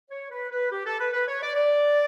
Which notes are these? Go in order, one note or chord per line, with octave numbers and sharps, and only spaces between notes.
C#5
B4
B4
G4
A4
B4
B4
C#5
D5
D5